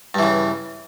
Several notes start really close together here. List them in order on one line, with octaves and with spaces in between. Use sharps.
G2 E3 C#3